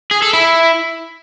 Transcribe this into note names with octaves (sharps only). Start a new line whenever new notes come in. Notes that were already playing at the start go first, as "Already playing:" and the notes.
G#4
A4
E4